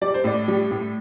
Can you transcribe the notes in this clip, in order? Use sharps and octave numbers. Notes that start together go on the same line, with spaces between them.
G3 D5
C5
A2 D5
G3
A2